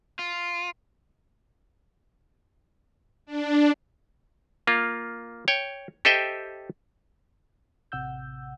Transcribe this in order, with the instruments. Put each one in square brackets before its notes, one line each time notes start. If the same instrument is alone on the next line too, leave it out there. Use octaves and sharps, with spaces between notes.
[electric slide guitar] F4
[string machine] D4
[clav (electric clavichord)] A#3 F4
C#5 G5
G4 A4 C5 D#5 E5 G5
[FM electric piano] A1 C3 F#5 E6 G6